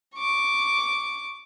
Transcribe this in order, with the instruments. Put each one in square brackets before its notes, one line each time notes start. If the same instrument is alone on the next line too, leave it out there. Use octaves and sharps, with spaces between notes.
[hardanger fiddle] C#6 D6